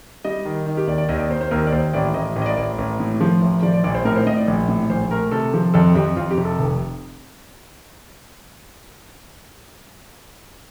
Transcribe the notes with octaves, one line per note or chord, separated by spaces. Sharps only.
G3 D#5
D#3
D#3
G4
D#2 D5
D5
D#2 D#5
D5
D#2 C5
C5
D#2 A#4
D5
D#2 C5
A1 D5
A1 D#5
A1
D#5
D5
A1 D5
A1
A2
F3
A1
F3 D5
D5
A#1 D5
C5
A2 A#4
C5
A2 D#5
D5
A#1
A2
A#1 C5
A3 A#4
C3 A4
F3
F2 A4
F2 G4
F2 F4
G4
C3
A4
F1